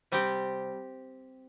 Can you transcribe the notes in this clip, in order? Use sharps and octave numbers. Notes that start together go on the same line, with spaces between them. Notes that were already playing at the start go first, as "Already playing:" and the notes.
C3 G3 C4 G4